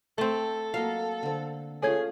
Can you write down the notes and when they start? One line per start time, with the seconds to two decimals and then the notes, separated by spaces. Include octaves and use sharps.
0.18 A3 C4 A4
0.74 F#3 A#3 D#5 F5
1.23 D3 C4
1.82 A3 C#4 F4 G#4 A4 C#5 G#6